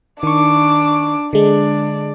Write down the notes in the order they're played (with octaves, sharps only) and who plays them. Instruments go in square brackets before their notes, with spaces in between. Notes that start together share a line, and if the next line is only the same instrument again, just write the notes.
[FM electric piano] D#3 C#6 [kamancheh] D4 D6
[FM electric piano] D3 G#3 [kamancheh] D4 D5